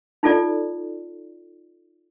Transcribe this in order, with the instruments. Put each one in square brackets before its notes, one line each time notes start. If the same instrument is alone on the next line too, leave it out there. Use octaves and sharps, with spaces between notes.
[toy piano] D#4 F4 A4 D5